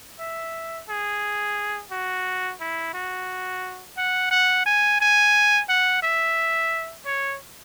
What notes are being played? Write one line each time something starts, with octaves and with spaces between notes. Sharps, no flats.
E5
G#4
F#4
E4
F#4
F#5
F#5
G#5
G#5
F#5
E5
C#5